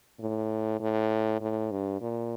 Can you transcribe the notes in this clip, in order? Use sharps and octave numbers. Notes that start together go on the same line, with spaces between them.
A2
A2
A2
G2
A#2